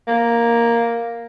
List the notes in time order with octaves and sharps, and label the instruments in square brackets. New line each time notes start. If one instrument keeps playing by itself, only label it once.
[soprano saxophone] A#3